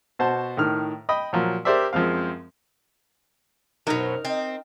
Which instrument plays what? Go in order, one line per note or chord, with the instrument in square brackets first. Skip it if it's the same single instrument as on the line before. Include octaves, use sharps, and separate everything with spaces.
[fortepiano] B2 F#4 C5 A5 C6
A2 D#3 F6
D#5 G5 B5 D#6
A#2 F3 F#3
G4 A#4 C5 D5 E5
F#2 F3 G#3 C4 F5
[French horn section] F#2 C5 [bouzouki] B2 F#3 [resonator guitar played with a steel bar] D#4 A#4
[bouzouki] C4 [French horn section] D#5